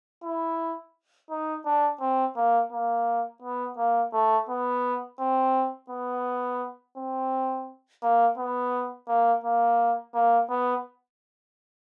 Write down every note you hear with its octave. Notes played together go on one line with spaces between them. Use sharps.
E4
D#4
D4
C4
A#3
A#3
B3
A#3
A3
B3
C4
B3
C4
A#3
B3
A#3
A#3
A#3
B3